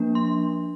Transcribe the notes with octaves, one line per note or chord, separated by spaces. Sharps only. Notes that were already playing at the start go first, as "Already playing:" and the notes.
Already playing: F3 A#3 D4
C6